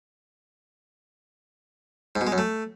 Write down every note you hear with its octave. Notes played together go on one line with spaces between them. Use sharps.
G#2
B2
G#3
F#2
A3